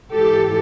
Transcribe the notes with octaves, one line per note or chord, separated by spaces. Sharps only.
G#2 E3 G4 A4